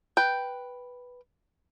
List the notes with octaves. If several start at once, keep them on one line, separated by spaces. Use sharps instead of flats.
B4 G5